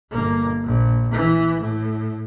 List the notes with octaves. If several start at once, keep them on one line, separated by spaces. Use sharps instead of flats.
G1 A#3
A#1
E3
A2